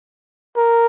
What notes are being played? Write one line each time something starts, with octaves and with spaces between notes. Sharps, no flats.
A#4